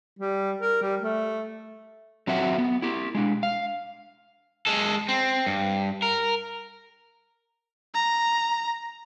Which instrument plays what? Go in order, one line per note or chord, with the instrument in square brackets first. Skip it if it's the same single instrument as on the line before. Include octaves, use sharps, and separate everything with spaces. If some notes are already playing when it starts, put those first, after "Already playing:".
[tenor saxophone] G3
A#4
G3
A3
[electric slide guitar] F#3 C4 A4 E5 F#5
B3
E4 G4
G#3 D4
F5
[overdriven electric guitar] G#3 A4
C4
G2
A#4
[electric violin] A#5